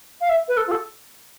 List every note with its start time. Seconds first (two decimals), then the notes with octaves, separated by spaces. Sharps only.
0.21 F5
0.29 E5
0.48 B4
0.57 A4
0.67 F4
0.71 A4